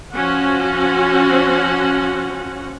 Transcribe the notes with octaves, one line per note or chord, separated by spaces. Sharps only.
F3 C#4 F#4 F#5